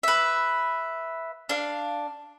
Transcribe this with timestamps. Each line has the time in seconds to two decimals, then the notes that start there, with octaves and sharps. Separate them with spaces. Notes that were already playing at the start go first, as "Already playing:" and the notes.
0.03 B4 E5
1.49 D4 F5